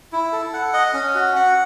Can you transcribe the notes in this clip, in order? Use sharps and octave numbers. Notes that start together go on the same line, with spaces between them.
E4
A4
F#5
D#5
C#4
F#4
F#5